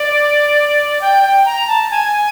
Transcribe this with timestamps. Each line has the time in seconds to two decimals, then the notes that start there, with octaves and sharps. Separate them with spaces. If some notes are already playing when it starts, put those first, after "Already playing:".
Already playing: D5
1.01 G5
1.23 G5
1.46 A#5
1.68 A5
1.91 G#5